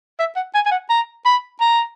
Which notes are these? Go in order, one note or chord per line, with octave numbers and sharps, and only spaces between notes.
E5
F#5
G#5
G#5
F#5
A#5
B5
A#5